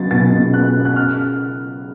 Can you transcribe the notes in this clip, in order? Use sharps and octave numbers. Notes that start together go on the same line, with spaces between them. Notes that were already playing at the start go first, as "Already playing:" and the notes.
Already playing: C#2 F#3 B3 A6
B2 A6
B2
B3 F#6
B3
F#6
C#3 F6